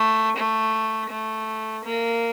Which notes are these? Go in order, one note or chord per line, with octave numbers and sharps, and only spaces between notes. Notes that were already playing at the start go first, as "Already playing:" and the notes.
Already playing: A3
A3
A3
A#3